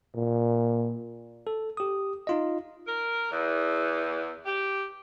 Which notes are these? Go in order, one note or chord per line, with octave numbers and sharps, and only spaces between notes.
A#2
A4
G4 D#6
D#4 F4 D#5
A#4
E2
G4